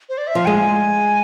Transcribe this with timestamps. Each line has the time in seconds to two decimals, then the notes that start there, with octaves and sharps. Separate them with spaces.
0.09 C5
0.18 D5
0.27 E5
0.35 F3 F5
0.46 G#3 G#5